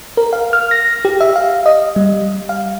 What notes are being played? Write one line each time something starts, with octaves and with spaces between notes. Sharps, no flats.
A#4
F5
F6
A#6
G4
E5
F5
D#5
G3
F5